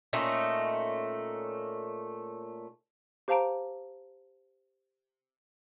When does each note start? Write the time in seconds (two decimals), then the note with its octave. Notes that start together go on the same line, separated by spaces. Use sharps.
0.13 A#2 A3 C#4 D#4
3.28 G4 C5 F5 A5 A#5 D7